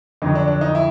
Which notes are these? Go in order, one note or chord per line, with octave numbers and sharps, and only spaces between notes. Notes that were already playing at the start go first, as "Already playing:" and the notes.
F2 D3 F#3 D#4
D4
D4
D#4
E4